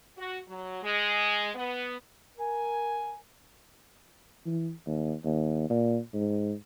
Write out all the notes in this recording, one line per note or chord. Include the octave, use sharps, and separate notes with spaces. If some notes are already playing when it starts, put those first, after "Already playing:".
F#4
F#3
G#3
B3
A#4 G#5
E3
D#2
D#2
A#2
G#2